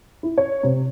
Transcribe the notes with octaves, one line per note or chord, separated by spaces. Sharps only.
E4
C#5
C3